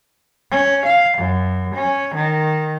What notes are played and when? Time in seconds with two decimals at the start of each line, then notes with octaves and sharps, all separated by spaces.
0.51 C#4
0.86 F5
1.18 F#2
1.75 C#4
2.15 D#3